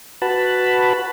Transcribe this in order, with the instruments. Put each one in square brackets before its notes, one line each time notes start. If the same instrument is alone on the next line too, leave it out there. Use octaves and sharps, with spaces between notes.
[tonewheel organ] F#4 B4 A5 B5